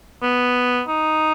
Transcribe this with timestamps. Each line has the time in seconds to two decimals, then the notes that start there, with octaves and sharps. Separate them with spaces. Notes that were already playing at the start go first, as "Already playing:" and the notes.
0.23 B3
0.88 D#4